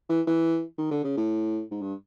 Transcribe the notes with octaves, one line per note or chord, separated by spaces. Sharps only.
E3
E3
D#3
D3
C#3
A2
G#2
G2